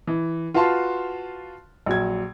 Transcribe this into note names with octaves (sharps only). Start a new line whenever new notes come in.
E3
F4 F#4 B4 F5 A5 C6
A#1 F#3 G#6